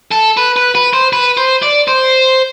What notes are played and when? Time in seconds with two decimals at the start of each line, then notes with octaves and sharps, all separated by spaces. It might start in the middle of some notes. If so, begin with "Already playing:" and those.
0.11 A4
0.37 B4
0.56 B4
0.75 B4
0.93 C5
1.13 B4
1.38 C5
1.63 D5
1.88 C5